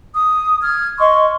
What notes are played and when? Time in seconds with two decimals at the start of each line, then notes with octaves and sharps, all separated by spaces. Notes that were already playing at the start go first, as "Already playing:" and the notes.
0.15 D#6
0.63 F6 G#6
0.99 D#5 C6 C#6